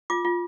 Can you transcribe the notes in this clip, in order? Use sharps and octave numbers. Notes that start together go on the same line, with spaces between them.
F4 D6
F4